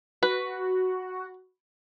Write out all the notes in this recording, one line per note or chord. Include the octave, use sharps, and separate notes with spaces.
F#4 B4